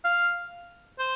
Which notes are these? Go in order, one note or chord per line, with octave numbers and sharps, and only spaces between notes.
F5
C5